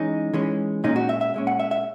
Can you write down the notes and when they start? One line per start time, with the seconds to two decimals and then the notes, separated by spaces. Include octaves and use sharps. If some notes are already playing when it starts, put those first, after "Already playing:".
Already playing: E3 G#3 C#4 D#4
0.34 E3 G#3 C#4
0.84 A#2 G#3 C#4 D#4
0.96 F#4
1.09 E5
1.21 E5
1.34 A#2 G#3 C#4
1.47 F#5
1.60 E5
1.71 E5